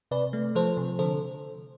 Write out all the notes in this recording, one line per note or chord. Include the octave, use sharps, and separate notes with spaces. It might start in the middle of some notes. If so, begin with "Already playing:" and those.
C3 B4 D5
A3
F3 A4 C5
C3
D3 A4 C5